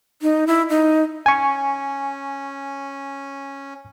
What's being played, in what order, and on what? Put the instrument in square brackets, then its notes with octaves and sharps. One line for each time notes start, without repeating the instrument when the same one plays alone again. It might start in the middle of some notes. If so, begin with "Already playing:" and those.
[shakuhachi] D#4
E4
D#4
[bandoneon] C#4 [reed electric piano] G#5 C#6